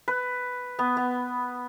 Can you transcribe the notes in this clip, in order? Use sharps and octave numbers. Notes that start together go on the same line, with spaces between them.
B4
B3
B3